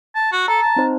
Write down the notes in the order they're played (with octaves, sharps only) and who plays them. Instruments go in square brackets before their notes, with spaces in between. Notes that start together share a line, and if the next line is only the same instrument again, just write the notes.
[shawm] A5
F#4
[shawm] A4 [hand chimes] A#5
[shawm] A5
[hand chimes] C4 D#4 C5